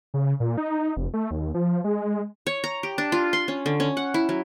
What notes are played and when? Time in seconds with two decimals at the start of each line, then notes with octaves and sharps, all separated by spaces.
0.14 C#3
0.40 A#2
0.58 D#4
0.97 F1
1.14 A3
1.31 D#2
1.54 F3
1.84 G#3
2.47 C#5
2.64 A#5
2.83 G4
2.98 D4
3.12 F4
3.33 C6
3.48 C#4
3.66 D3
3.80 C#4
3.97 F#5
4.14 E4
4.29 F#3